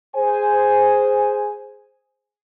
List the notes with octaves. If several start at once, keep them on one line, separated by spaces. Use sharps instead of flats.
G#4 C5 G#5